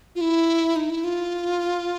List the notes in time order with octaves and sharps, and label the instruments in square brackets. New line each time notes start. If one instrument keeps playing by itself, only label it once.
[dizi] F4
E4
D#4
E4
F4